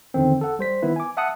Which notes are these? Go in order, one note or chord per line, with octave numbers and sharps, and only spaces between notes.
E2 D3 D#3 C4
A4 F#5
G#1 G3 C5 B6
D#3 B3 E4 B4
G#5 D6
E5 F#5 A5 D#6 F#6 C#7